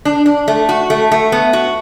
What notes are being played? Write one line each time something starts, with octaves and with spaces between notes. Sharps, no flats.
D4
D4
A3
F#4
A3
A3
B3
F#4